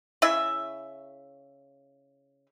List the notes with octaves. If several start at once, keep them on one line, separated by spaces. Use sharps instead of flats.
C#3 E4 E5